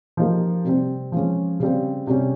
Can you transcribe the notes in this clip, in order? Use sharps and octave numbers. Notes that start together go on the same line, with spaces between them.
F3 A#3 D#4 G4
C3 G3 C4
F3 G#3 C#4
C#3 G3 C4
C3 G3 C#4 G4